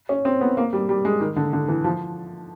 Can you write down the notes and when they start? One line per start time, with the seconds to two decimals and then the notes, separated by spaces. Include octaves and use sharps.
0.09 C#4
0.25 C4
0.41 B3
0.57 A#3
0.73 G3
0.89 G3
1.05 G#3
1.20 D#3
1.36 D3
1.53 D3
1.68 E3
1.84 F3